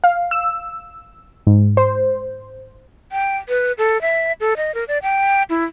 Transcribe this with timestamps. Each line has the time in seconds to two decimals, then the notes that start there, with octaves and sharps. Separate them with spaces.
0.04 F5
0.31 E6
1.47 G#2
1.77 C5
3.12 G5
3.49 B4
3.78 A4
4.01 E5
4.40 A4
4.57 D#5
4.74 A#4
4.88 D5
5.02 G5
5.50 E4